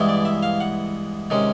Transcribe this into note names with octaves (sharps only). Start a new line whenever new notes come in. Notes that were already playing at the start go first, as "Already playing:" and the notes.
Already playing: G2 E3 G#3 B3 E4
D5
E5
F5
F#5
C3 D#3 G#3 C#4